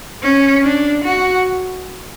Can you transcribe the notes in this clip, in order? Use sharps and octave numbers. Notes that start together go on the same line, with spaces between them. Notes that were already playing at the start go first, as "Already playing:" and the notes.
C#4
D4
F#4